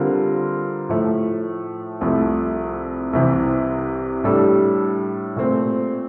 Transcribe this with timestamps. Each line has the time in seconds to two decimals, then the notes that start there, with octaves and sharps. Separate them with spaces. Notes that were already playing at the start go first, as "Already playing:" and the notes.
Already playing: D3 G3 C4 F4 A#4
0.89 A2 F3 A3
2.01 C2 C3 F3 A3 E4
3.13 C2 C3 E3
4.24 A2 G3 D4 A4
5.36 A#2 A3 C4